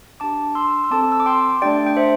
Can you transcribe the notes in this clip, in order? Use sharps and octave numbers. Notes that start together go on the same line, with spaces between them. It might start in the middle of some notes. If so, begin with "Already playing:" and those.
D4 G4 A5 D6
C6 E6
E6
C4 A4 A5 D6
E6
D6
G5 C6
A3 D4 G4 D5 G5
G5
C5 E5